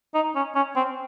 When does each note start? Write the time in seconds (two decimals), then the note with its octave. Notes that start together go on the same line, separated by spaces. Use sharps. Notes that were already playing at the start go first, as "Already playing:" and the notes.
0.14 D#4
0.35 C#4
0.55 C#4
0.76 C4